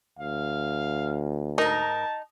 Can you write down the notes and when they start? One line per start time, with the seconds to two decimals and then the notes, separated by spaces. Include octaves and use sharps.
0.19 D2 F5
1.58 G#2 D#4 A#4 A5